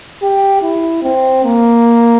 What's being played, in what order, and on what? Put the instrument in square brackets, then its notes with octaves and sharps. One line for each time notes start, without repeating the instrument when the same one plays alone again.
[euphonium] G4
E4
C4
A#3